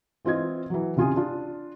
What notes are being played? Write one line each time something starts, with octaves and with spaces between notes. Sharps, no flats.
E3 C4 F4 D#5 G#6
E3 F#3
C2 C#3 F4 G#5 D#6
D4 F4